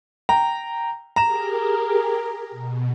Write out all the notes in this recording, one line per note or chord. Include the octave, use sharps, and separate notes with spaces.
G5 A#5
G4 G#4 A#4 A#5 E7
B2